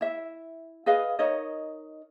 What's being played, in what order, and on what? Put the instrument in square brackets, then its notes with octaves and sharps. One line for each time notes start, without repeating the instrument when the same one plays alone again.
[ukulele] E4 E5
G#4 B4 D#5 F5
D#4 A#4 C#5 D#5